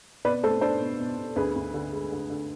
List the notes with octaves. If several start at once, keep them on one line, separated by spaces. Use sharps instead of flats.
B2 B4 D5
A3 A4 C5
D4 A4 C5
B2
B2
B2
D2 G#4 B4
D2
D3
G#3
D3
D3